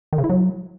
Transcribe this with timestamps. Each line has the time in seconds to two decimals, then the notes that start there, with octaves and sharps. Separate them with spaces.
0.13 D#3
0.18 C#3
0.24 E4
0.30 F#3